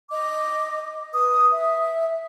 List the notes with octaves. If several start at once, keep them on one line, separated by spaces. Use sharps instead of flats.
D#5 D6
B4 D#6
E5